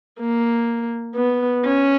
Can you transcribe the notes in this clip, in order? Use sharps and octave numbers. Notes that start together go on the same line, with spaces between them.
A#3
B3
C#4